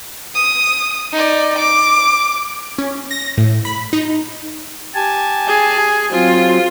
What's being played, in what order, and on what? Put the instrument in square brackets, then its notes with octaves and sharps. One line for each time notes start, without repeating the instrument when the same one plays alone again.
[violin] D#6
D#4 D5
D6
[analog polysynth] C#4
A#6
A2
B5
D#4
[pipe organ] G4 G#5 A5
[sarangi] G#4
[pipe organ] F#3 C4 [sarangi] F4